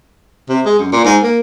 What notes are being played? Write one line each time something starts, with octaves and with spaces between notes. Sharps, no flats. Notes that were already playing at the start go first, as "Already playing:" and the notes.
C3
G#3
F#2
A#2
G#2
A#3